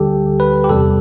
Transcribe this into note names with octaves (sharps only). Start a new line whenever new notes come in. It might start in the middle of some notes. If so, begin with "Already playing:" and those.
Already playing: D2 D3 G3 G4 A4
B4
G4
E2 C3 G3 A4